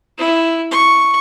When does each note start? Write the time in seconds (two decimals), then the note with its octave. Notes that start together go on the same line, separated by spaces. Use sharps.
0.19 E4
0.71 C#6